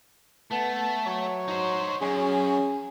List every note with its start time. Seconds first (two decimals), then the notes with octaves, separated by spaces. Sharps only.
0.52 A3 B3 A5
1.06 F#3 C#5
1.48 D#4 C5
2.02 F#2 C#4 G#4